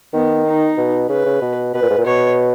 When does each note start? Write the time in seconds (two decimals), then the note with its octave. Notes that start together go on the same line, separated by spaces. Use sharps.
0.13 D#3 B3
0.46 D#4
0.77 B2
1.09 C#3 B4
1.25 C#3
1.42 B2
1.74 B2 B4
1.82 A#2
1.90 G#2
1.98 A#2
2.06 B2 C#5